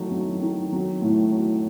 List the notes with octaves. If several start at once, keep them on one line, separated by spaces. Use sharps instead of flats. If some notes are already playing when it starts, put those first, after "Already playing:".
Already playing: D#3 F#3 A3
F#3
D#3
F#3
A2
F#3